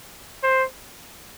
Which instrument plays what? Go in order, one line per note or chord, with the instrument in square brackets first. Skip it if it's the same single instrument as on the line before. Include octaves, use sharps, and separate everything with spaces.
[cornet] C5